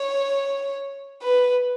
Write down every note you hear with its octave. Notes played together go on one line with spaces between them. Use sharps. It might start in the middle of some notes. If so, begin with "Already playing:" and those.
Already playing: C#5
B4